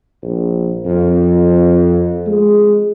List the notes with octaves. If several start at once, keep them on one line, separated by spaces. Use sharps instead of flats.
A#1
F2
G#3